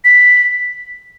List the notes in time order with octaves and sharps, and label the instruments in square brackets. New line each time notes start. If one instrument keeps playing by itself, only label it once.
[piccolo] B6